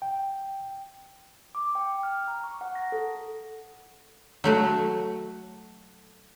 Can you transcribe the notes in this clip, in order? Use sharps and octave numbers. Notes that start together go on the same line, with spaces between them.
G5
D6
G5
F6
A#5
C#6
F#5
A#6
A4
F#3 A3 F#4